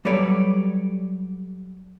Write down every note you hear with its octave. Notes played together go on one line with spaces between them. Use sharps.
F#3 G3 A4 B4 C#5 D5